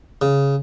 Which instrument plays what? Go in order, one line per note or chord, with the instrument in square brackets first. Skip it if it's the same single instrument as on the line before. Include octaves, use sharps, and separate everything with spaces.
[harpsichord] C#3